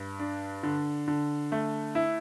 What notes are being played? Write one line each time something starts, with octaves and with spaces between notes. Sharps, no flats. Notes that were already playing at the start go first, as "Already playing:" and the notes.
Already playing: G2
D4
D3
D3
A3
E4